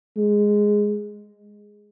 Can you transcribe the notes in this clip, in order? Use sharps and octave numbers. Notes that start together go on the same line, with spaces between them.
G#3